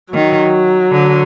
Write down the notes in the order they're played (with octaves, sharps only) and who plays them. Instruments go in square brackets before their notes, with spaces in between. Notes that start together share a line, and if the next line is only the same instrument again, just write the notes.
[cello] D#3 [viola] F#3
[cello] D3